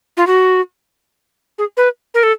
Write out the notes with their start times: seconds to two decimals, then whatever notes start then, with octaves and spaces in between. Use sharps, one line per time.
0.17 F4
0.27 F#4
1.58 G#4
1.77 B4
2.14 A#4
2.23 A4